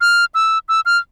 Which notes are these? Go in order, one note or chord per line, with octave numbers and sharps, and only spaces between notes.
F6
E6
E6
F6